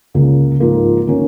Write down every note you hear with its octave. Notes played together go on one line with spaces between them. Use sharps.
C#2 C#3 A#3
G#2 F3 A#3
D#3 A#3 C#4